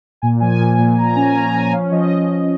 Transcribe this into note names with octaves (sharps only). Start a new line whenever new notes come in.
A#2 G#5
F3 G#5
A#2
A#2
A#2 A#5
C#4 G#5
F3 A#5
F3 G#5
C#4 F5
F3 D#5